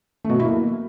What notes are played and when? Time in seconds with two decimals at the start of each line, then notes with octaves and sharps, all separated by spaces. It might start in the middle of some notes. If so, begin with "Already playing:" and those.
0.24 A3
0.29 B2
0.35 F#3
0.40 E4
0.45 A#3